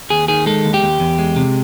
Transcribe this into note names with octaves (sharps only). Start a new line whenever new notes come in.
D#2 G#4
D#3 G#4
G#3 A4
D#2
G4
D#2
E2
G#3
C3